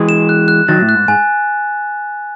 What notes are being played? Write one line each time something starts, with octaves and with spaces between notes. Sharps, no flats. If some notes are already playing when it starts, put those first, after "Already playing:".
Already playing: E3 G#3
E7
F#6
F#6
D#3 F#3 A6
A2
F#6
G#2
G#2 G#5